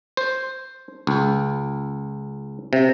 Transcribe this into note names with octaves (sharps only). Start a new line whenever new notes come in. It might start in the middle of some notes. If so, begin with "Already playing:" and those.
C5
C#2
C3